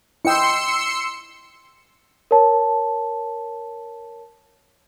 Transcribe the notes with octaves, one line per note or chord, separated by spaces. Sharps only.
E4 D#5 G5 C6 E6 C#7
A#4 C#5 A5